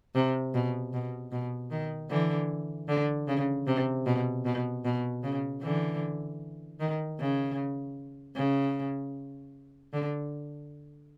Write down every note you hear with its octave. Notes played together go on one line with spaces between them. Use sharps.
C3
B2
B2
B2
D#3
D3 E3
D3
C#3
C3
B2
B2
B2
C#3
D3 E3
D#3
C#3
C#3
D3